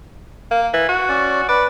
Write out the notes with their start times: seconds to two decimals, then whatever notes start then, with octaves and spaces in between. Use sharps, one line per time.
0.51 A#3
0.74 E3
0.89 F#4
1.09 C#4 D5
1.49 B4 D5